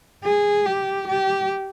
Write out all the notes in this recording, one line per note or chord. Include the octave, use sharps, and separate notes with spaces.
G#4
G4
G4